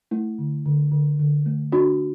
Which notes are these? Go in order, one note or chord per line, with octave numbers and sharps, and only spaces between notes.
A3 E4
D3
D3
D3
D3
A3
D4 F#4